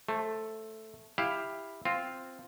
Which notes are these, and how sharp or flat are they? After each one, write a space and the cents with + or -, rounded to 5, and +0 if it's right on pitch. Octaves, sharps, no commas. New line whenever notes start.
A3 +0 C5 +25
E4 +0 G4 +15 F5 +0
C4 +0 F4 +0